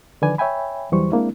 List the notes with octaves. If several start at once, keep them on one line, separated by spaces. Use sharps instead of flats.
D3 D#3 F3 B4 D5 G#5
C#5 E5 G5 G#5 B5
E2 E3 F#3 G3 C5 C#6
G#3 A#3 C4 D4 E4